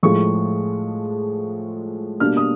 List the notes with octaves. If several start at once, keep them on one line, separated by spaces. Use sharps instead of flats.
A2 F3 G#3 C#6
B2 G3 A#3 D4 F6
D#6